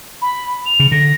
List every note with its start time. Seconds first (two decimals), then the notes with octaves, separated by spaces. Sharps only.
0.22 B5
0.65 F7
0.80 C#3
0.92 D3 A#6